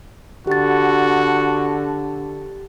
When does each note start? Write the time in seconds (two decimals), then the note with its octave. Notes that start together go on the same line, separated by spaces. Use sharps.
0.47 D3 F#4 G4 A6